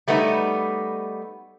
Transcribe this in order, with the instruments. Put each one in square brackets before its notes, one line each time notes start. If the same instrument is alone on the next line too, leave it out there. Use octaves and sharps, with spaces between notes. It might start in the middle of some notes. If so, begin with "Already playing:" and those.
[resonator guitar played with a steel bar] G3 A3 B3 D#4